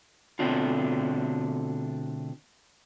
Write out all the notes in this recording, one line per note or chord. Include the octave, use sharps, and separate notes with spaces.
B2 D3 A3 C4 D4 F4